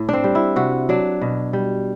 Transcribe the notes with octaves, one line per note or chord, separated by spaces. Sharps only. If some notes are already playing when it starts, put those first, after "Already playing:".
Already playing: A2
C4 D4
G3
E4
C3 F#4
F#3 D4
B2
G3